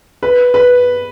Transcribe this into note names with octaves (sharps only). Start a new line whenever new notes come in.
B4
B4